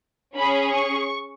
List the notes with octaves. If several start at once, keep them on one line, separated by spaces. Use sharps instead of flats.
C#4 G#4 B5
C#6